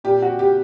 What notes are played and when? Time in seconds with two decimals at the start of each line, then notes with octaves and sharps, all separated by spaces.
0.04 A#2 G4
0.22 F#4
0.39 G4